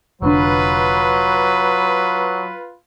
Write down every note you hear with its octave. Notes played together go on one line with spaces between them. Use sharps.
F1 D3 F#3 D4 F4 B4